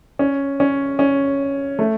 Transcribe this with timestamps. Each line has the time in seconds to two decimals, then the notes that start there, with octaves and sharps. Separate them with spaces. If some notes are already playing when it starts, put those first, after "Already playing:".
0.19 C#4
0.60 C#4
0.99 C#4
1.79 A3